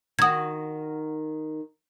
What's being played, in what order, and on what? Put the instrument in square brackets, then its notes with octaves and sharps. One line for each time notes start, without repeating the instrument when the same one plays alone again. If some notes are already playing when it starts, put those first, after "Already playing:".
[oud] D#3 F#4 [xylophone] D#6 G#6